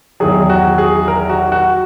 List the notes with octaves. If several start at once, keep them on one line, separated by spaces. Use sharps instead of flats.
E2 D#3 F#3 G#4
F#4
G#4
A#4
F#4
F#4